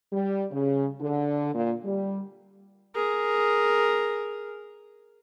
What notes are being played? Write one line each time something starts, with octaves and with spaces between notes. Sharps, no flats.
G3
C#3
D3
A#2
G3
G#4 A#4